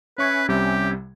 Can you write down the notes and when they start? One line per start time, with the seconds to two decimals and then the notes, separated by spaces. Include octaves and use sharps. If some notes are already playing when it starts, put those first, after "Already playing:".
0.18 C#4 B4 E5 G#5 B5 C#6 G#6
0.49 C2 C3 G3 G4